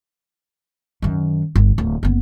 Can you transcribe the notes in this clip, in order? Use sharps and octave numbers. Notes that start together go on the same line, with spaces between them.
F#2 D#3
G1
D1
F#1 B3